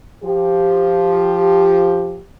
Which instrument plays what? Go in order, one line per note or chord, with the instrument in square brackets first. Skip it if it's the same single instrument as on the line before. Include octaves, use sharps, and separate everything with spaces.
[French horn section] F3 G4